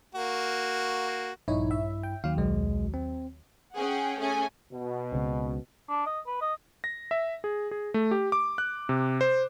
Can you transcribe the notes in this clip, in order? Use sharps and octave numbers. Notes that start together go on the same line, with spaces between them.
A#3 F#4
A#1 G2 D#4 E4 C#5
E5
G5
D#2 F#3 F5
B1 G#3
C4
C#4 G#4 F#5 G5
A3 C#4 G#4 G#5
B2
C#2 C#3 C4
D4
D#5
B4
D#5
A#6
E5
G#4
G#4
A3
G4
D6
F#6
C3
C5